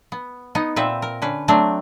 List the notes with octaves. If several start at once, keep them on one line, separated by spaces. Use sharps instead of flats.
B3
B3 D#4
A#2 C4 B4 E5
A#4
D3 C#4 B4
F#3 A3 C4 D4